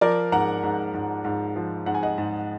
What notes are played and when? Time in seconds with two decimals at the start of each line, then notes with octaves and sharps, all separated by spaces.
0.01 F3 A#4 D5
0.32 G#2 F#5 A#5
0.63 G#2
0.94 G#2
1.25 G#2
1.56 F3
1.86 G#2 F#5
1.94 G#5
2.03 D#5 F#5
2.18 G#2